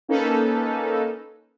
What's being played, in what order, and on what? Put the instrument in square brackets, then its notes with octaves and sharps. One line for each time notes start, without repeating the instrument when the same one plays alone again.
[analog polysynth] A#3 C#4 D#4 A4 B4